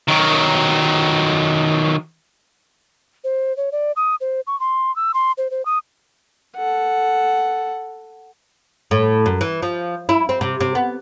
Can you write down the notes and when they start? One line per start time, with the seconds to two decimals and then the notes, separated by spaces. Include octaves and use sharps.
0.08 D#3 F#3
3.24 C5
3.57 C#5
3.72 D5
3.96 D#6
4.21 C5
4.47 C#6
4.60 C6
4.96 E6
5.14 C6
5.38 C5
5.51 C5
5.65 D#6
6.56 A4 F#5
8.91 A2
9.26 F#2
9.41 E3
9.63 F3
10.09 E4
10.29 C4
10.41 C3
10.60 C3
10.75 B3